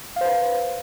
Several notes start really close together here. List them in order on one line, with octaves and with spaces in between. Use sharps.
F5 C5 B4